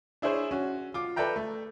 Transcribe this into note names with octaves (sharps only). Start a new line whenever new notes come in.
D4 E4 G#4 C5 C#5
C#4 F#4
F4 D6
A4 B4 D5 E5 G5 A#5
A3